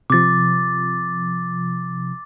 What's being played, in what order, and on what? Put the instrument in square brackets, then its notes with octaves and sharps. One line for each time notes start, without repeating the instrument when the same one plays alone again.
[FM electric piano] C3 F3 [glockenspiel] D6 A6